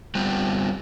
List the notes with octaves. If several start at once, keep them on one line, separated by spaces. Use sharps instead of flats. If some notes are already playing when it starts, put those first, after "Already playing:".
G3 B3 C4 F4